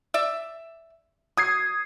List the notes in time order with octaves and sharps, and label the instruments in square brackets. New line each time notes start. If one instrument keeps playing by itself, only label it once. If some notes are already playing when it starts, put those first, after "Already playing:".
[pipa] D5 E5
[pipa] F#3 [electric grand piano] D#6 G#6 C7